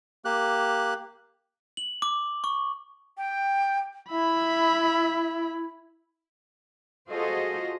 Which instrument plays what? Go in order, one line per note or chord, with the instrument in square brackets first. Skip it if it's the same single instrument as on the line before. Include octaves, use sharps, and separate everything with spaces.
[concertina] A#3 G4 F#6
[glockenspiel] F#7
D6
C#6
[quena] G5
[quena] E4 [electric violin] E5 B5
[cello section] F4 F#4 G#4 A4 C5 D#5